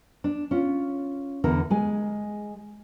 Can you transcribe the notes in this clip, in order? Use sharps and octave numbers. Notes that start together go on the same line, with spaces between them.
D4
C#4 F4
E2 D3 E4 A#4
G#3 G#4 G#5